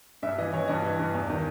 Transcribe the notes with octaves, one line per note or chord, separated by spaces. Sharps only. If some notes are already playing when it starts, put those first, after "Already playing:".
G2 E5
E3 D#5
E3 C#5
G2 D#5
E3
G2
E2
D#3